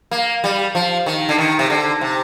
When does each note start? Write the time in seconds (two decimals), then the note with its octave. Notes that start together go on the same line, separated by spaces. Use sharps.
0.11 A#3
0.44 G3
0.75 F3
1.06 D#3
1.29 D3
1.38 D#3
1.59 C3
1.70 D3
2.01 C3